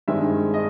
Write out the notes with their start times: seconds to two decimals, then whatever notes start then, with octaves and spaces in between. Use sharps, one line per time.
0.08 G2 D#3 G#3 C4 E5
0.54 D#5